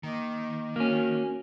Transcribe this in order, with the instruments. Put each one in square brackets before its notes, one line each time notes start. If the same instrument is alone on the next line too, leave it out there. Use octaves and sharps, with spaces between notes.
[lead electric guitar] D#3 [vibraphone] A#3 D#5 D6
[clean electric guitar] A#3 C#4 [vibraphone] F#4